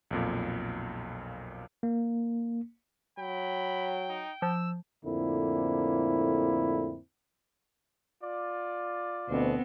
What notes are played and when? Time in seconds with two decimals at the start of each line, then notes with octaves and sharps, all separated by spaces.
0.11 B1 F2 A#2
1.83 A#3
3.19 F#3 G5 B5
4.10 D#4
4.42 F3 E6
5.05 F2 A2 D3 A#3 C4 E4
8.22 F4 D5
9.28 D2 B2 B3 C4